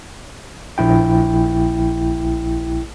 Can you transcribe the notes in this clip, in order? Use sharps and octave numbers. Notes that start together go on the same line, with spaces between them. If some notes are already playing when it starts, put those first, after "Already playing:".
A#1 E4 G5